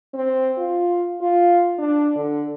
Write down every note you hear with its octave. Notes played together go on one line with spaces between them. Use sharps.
C4
F4
F4
D4
D3